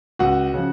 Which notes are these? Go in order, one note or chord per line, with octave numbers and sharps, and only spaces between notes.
C#2 F#4 F#5
C#3 F3